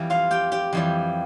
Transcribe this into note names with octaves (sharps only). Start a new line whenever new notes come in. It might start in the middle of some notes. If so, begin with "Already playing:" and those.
Already playing: F2 E3 G3
F4 F5
G4 G5
G4 G5
F2 E3 G3